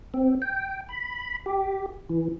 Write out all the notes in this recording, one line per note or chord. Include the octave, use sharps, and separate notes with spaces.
C4
G5
B5
G4
E3